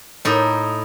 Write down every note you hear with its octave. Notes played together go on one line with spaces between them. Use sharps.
A2 D#4